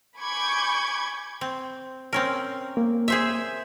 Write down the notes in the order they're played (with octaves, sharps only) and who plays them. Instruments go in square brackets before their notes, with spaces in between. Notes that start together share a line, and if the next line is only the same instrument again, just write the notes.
[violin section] G#5 B5 C#6 D6 G6 G#6
[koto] C4
C4 C#4 A#4
[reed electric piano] A#3
[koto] G#4 C5 E5